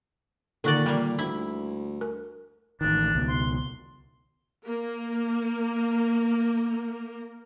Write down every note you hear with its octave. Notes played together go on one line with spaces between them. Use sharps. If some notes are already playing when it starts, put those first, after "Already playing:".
A#2 D3 D#3 F#4 A4 D5
G3 A#3
D2 E4
A#4
A1 D#3 D4
C#2 B2 D#3
C6
A#3 A#4